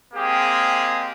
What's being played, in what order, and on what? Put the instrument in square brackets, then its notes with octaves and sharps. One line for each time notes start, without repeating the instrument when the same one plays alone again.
[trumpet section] G#3 A#3 C4 G4 G#4